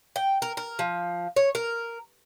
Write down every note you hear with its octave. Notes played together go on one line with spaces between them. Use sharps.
G5
A#4
A#4
F3
C#5
A#4